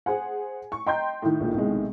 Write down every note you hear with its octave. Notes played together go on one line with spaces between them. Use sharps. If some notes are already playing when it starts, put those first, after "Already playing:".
G#4 C5 F#5 G#5
C#6
D#5 G5 A#5 C6 G6
A2 D#3
A#1 A#2
B1 C3 G#3